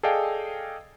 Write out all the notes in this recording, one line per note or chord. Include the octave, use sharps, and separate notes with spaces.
G#4 A4 D5 D#5 F5 G5